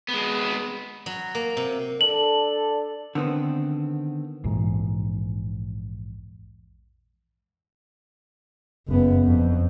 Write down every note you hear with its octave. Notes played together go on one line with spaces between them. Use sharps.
G#3 B3
F#3
A#3
C3
D4 A4 F#7
D3 D#3 B3 C4
A#1 E2 G#2
F#1 B3
F2